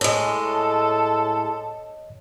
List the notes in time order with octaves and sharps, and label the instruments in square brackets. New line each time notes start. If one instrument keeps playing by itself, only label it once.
[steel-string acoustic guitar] A2 G#3 [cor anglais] A4 [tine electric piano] C#5 D#5